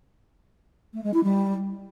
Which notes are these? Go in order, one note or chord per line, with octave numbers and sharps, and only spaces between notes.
A3
G#3
E4
G3